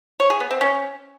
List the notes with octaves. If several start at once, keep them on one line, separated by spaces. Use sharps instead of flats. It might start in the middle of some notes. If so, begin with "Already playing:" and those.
C#5
G#4
B3
C4
C#4